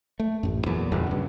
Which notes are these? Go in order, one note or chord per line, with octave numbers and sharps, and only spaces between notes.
A3
A1 F#2
E2 A#2 F#3
G1 E2 B2
G2 C#3